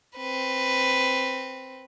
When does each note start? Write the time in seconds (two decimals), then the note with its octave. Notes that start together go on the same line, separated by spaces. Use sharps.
0.17 C4 B4